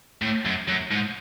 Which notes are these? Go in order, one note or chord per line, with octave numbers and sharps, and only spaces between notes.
A2
F#2
F#2
G#2